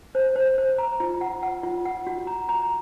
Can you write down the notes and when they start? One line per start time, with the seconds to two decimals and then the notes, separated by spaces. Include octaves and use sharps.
0.15 C5
0.36 C5
0.58 C5
0.78 A#5
1.00 F4
1.21 F#5
1.43 F#5
1.63 F4
1.85 F#5
2.07 F#4
2.27 A#5
2.49 A#5